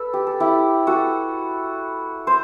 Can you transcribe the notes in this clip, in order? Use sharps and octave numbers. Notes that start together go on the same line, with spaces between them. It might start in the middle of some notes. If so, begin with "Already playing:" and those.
Already playing: A4 B4
G4
A4
E4 G4
F#4 A4
C5